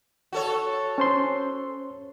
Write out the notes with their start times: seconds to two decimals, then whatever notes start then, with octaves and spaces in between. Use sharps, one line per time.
0.33 F#4 A4 C#5
0.98 C#4 C5 C6